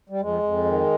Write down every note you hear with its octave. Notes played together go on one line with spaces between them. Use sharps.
G3
F2 G#3
F2
D#3